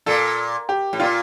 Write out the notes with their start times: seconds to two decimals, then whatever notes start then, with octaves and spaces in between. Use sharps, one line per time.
0.06 A#2 A4
0.69 G4
0.93 A2
1.00 A#2 F4